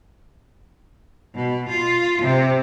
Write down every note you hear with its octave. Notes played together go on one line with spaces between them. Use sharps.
B2
F4
C3